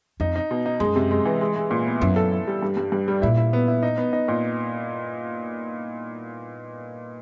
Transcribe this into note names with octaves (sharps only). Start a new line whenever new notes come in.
F2 D#4
D#4
B2
D#4
F#2 G#3
C3
G#3
E3
G#3
G#3
A#2
B3
F#2 E4
A4
E4
G3
G2
G2
G2
G3
A#2 E4
E4
B3
E4
D#4
B3
D#4
A#2